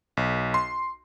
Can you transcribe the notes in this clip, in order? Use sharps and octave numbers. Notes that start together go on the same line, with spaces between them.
B1
C6